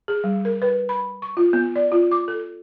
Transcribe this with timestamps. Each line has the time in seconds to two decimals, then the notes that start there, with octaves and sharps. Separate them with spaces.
0.08 G#4
0.24 G3
0.45 A#4
0.62 B4
0.89 B5
1.22 C#6
1.37 F4
1.53 B3
1.76 D5
1.92 F4
2.12 D6
2.28 A4